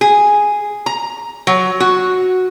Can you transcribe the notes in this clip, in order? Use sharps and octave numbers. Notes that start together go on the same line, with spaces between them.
G#4
A#5
F#3
F#4